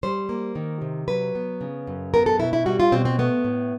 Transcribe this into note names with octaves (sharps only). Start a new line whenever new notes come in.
G3 C5
A#3
D#3
C3
F#3 B4
B3
C#3
F#2
B3 A#4
A4
B2 E4
E4
G3 F#4
F4
B2 C4
C4
A3 B3
A2